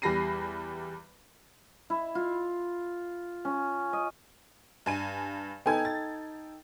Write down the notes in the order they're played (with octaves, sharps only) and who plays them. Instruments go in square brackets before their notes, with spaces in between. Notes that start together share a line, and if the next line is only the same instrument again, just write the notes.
[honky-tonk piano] E2 G3 B5 A#6 C7 D#7
[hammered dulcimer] E4
F4
C#4
D#5
[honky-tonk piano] G2 G#5 D#7
[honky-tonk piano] B3 G#5 G#6 [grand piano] D#4 A4 G5
[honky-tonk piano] A6